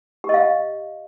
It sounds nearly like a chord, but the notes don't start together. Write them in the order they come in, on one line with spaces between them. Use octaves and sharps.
G4 D#5 F5